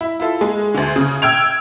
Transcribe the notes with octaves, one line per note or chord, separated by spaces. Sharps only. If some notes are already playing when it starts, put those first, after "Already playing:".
E4
E4 F4 A4
G#3
D2 D3
C#3
G5 E6 F6 G#6 D7 F7